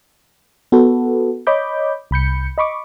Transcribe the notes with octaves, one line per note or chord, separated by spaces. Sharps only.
B3 F#4 A4 B4
C#5 D#5 B5 D6 G6
C2 B5 G6 C#7
D#5 B5 C#6 D6